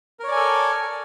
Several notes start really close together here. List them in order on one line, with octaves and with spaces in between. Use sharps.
A#4 C#5 D5 G#5 A4